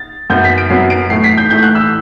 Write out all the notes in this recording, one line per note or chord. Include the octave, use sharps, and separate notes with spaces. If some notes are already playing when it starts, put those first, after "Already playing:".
Already playing: A6
F#2 F#3 B3 G6
B6
D7
F#2 F#3 B3 C7
D7
A2 E3 A3 C7
B6
G6
A2 E3 A3 G6
F#6
E6